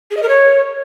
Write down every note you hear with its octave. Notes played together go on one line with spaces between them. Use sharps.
G#4
D#5
A#4
C#5